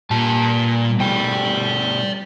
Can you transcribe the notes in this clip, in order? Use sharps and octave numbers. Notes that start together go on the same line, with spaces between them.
A#2 G3 A5
B2 G3 A3 D5 G5